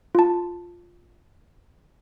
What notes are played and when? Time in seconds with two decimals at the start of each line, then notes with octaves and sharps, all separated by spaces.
0.15 F4 A5